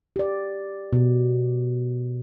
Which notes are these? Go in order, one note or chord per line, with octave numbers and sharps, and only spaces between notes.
G4 D5
B2